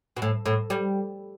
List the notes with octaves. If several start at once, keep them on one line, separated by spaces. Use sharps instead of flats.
B2
A2
A2
G3